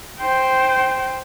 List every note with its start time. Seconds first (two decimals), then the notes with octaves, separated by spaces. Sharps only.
0.20 C5 G5